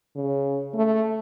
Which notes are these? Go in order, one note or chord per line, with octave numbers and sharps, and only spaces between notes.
C#3
A3